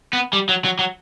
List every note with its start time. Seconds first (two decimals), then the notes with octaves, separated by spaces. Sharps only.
0.13 B3
0.33 G3
0.49 F#3
0.65 F#3
0.79 F#3